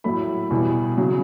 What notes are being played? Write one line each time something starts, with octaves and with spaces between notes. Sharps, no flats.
A2 F#3 A3 B5
E2 B2 G3
C#3 F#3